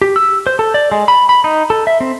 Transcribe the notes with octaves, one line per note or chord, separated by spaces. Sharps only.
G4
E6
C5
A4
D5
G#3
B5
B5
D#4
A4
E5
C4